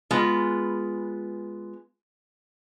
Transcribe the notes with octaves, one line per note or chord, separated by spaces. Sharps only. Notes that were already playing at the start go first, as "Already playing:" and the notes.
G#3 B3 F4